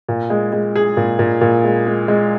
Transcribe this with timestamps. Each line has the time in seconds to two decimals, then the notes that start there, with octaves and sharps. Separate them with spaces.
0.08 A#2
0.30 G#3
0.52 G#3
0.76 G#4
0.97 A#2
1.19 A#2
1.41 A#2
1.64 G#3
1.86 G#3
2.08 G#3